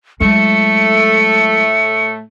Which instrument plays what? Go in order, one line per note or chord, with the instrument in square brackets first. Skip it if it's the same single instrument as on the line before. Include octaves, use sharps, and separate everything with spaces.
[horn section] A2 A3 [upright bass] F#3 G#3 [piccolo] C#7